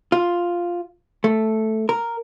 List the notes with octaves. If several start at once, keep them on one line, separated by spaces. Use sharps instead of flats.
F4
A3
A#4